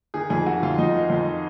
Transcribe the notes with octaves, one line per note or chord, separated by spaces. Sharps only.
D#3 G#4
F2 G#4
D#3 F#4
F2 F4
F2 D#4
D#3
F2